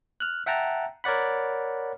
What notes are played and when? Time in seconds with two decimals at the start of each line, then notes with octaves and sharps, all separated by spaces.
0.20 F6 F#6
0.46 E5 F#5 G5 A5 A#5
1.04 A#4 C#5 D5 F#5 B5